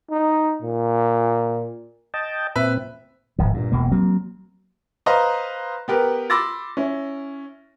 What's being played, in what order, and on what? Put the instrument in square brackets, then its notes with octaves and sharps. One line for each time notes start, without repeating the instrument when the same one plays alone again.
[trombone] D#4
A#2
[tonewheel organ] D#5 G5 A5
[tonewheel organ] A#2 C4 [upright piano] B4 E5
[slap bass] D1 G#1 F3
G2 A#2
E1 B2 A#3
F#3 A#3 C4
[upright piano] B4 C5 D#5 F5 A#5
B3 G4 A#4 B4
B5 C6 D6 E6 A6 A#6
C#4 E4